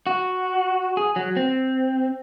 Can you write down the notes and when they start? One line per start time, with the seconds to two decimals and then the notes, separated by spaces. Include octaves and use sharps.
0.07 F#4
0.97 G#4
1.16 F#3
1.37 C4